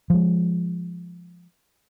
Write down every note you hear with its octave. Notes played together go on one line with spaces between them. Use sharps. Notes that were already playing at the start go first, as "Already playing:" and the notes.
F3 G#3